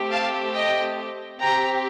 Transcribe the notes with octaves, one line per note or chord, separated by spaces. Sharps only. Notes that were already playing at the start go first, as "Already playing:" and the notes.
Already playing: A3 C4 G4
F5 A5
D#5 G5
C4 G4 G5 A#5